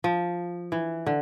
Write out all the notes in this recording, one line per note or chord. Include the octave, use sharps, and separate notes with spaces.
F3
E3
D3